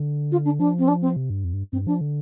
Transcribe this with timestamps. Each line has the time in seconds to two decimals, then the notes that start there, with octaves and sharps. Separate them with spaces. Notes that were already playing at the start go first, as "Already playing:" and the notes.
Already playing: D3
0.31 F4
0.45 D4
0.59 F3 D4
0.78 C4
0.88 D4
1.01 C4
1.16 C3
1.30 G2
1.44 F2
1.53 G2
1.72 G2 C4
1.87 F3 D4
2.01 D3